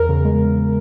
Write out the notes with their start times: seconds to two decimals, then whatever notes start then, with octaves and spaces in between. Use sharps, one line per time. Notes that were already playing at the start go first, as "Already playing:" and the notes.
Already playing: E2 A#4
0.09 C#3
0.25 G#3
0.40 E2